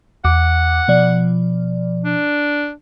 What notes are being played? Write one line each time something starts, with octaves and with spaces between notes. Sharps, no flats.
E2 F#5 D6
B2 F3 D5
D4